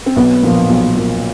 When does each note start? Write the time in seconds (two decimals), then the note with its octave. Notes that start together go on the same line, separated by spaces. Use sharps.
0.06 C4
0.16 B1 B3
0.43 A#2 F3
0.69 B1
0.95 A#2 F3